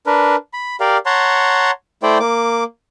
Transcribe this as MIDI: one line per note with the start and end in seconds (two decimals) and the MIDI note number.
0.06 0.36 62
0.06 0.36 70
0.06 0.36 71
0.53 0.76 83
0.80 0.97 67
0.80 0.97 70
0.80 0.97 74
0.80 0.97 77
1.06 1.71 73
1.06 1.71 78
1.06 1.71 81
1.06 1.71 82
1.06 1.71 84
2.03 2.18 57
2.03 2.18 64
2.03 2.18 72
2.03 2.18 74
2.03 2.18 79
2.20 2.64 58
2.20 2.64 86